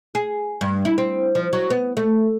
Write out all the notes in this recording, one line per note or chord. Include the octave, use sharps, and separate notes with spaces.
G#4
G2
E4
C4
F3
F#3
B3
A3